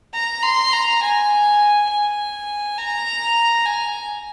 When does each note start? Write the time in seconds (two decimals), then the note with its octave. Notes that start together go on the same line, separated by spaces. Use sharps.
0.14 A#5
0.43 C6
0.73 A#5
1.03 G#5
1.89 G#5
2.78 A#5
3.66 G#5